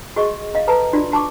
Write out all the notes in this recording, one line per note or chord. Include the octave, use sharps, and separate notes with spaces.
F#4 G#4 D#5 C#6
D#5 F5
A4 B4 A5 A#5
D4 F4 F#4 D5
F#4 A5 C#6 D6